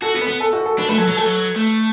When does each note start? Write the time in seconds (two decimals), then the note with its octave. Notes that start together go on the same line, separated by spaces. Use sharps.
0.02 F#4 A4
0.15 B3
0.21 B4
0.27 B3
0.40 A4
0.53 F#4
0.66 A4
0.78 D4 B4
0.89 A3 B4
0.98 F#3 A4
1.08 F#3
1.17 A3 A4
1.26 F#3
1.56 A3